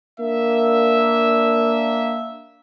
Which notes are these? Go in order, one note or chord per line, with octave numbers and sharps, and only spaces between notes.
A#3 D4 E5